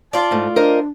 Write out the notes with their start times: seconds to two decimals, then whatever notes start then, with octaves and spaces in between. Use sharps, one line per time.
0.13 F4 D5 A5
0.31 G#2 A3
0.56 D4 A#4 C5 D#5